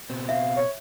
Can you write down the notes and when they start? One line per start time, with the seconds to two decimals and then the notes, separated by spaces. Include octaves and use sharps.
0.10 B2 C4
0.29 E5 F5
0.56 C#5